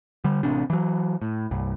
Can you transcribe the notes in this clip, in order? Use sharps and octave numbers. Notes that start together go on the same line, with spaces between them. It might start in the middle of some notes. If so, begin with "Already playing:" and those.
D3 G3
A1 C3 D4
E3 F#3
A2
C2 G2